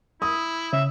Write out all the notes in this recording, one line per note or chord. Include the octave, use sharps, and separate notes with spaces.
E4 D#6
C#3 E5